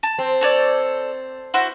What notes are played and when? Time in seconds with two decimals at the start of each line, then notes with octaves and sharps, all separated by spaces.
0.03 A5
0.18 C4
0.41 A4 C#5 D5
1.54 E4 F#4 C5